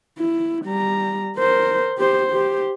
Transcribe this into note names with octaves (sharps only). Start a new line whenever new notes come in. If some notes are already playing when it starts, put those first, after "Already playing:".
E4
G3 A#5
A#4 C5
G4 C5
G4 C5